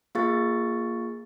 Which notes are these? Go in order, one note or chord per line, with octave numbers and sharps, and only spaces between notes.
A#3 F4 G#4 F5 C#6 A6